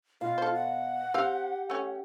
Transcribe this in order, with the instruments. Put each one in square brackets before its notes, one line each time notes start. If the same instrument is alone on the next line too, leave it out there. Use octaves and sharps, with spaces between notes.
[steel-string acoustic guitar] B2 F5 [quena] F4
[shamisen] A4 C5
[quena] F#5
[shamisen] C4 F5 [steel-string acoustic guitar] G4
[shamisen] A3 C#4